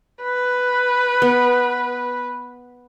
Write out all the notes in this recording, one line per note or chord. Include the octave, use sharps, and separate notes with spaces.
B4
B3